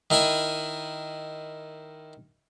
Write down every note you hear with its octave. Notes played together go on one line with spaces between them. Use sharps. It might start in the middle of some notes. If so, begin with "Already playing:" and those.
D#3 E4 G#5 B5